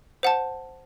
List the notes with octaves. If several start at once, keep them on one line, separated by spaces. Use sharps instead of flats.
C5 F#5 A5